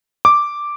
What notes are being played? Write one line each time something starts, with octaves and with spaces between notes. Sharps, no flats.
D6